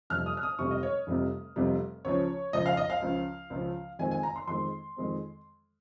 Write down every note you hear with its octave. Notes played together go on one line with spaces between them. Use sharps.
F1 F2 C3 G3 F6
D#6
F6
D#6
F1 F2 C3 G3 C#6
D#5
C#5
F1 F2 C3 G3
F1 F2 C3 G3
C#2 C#3 F3 C#5
C#2 C#3 F3 D#5
F5
D#5
F5
C#2 C#3 F3
C#2 C#3 F3
F2 D#3 G#3 C4 G#5
G#5
A#5
C6
F2 D#3 G#3 C4 C6
F2 D#3 G#3 C4